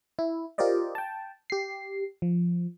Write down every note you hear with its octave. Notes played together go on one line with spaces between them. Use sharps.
E4
F4 G4 A#4 C5 D5 D#5
G5 A5
G4 C7
F3